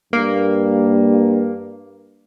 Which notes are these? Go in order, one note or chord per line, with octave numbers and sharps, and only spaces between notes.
G2 A#3